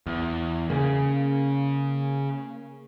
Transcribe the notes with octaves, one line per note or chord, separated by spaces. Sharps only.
E2
C#3 A#3 C#4 G#4